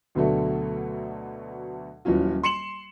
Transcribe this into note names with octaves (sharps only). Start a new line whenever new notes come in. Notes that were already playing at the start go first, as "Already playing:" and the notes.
D2 B2 D3 F#3 A3
D#1 E3 F#3 C#4 F4
C6 C#7 E7 F#7